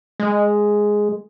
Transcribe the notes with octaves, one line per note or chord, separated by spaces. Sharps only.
G#3